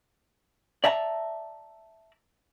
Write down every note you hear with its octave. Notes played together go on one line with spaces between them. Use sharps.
D5 E5 A5 A#5